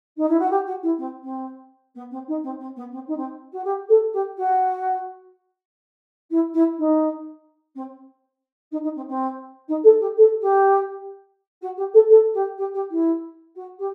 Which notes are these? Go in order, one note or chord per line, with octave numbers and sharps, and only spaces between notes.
D#4
E4
F#4
G4
F#4
E4
C4
C4
B3
C4
D#4
C4
C4
B3
C4
D#4
C4
F#4
G4
A4
G4
F#4
E4
E4
D#4
C4
D#4
D#4
C4
C4
D#4
A4
G4
A4
G4
F#4
G4
A4
A4
G4
G4
G4
E4
F#4
G4